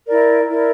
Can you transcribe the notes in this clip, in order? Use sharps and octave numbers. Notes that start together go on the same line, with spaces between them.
E4 A#4 D5
E4 A#4 D5